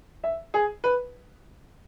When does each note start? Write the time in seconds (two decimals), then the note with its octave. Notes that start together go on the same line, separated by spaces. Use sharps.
0.24 E5
0.54 G#4
0.84 B4